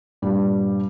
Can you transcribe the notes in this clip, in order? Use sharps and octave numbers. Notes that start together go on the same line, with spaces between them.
G2 A#2 G3